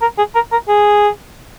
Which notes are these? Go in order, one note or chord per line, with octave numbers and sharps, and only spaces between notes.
A#4
G#4
A#4
A#4
G#4